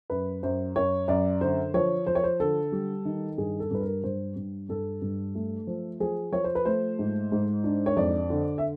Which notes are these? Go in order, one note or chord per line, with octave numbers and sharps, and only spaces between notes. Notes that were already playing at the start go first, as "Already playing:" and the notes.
F#2 B4
F#2 C5
F#2 C#5
F#2 D5
D3 C5
F3 C#5
F3 C5
C#5
C5
D3 A4
G3
D#3
G2 G#4
A4
G2 B4
A#4
G2 C5
G2
G2 A4
G2
A3
F3
F3 G#4
F3 C#5
C5
B4
A3 C5
G#2
G#2
D4
C#5
F2 D5
D3
E5